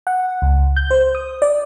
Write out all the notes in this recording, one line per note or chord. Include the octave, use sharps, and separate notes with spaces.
F#5
C#2
G6
C5
D#6
D5